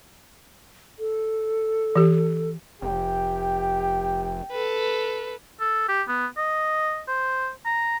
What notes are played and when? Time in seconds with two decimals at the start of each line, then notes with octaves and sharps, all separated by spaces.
0.99 A4
1.96 E3 G4
2.82 F1 G4 G5
4.52 A4 B4
5.60 A4
5.88 G4
6.08 B3
6.37 D#5
7.08 C5
7.65 A#5